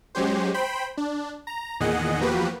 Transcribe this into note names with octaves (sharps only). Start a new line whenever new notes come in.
F#3 G#3 C#4 G4 C5
C5 G5 B5
D4
A#5
E2 A#2 D#3 G#4 D#5 F#5
E2 F3 A#3 F#4 G4 B4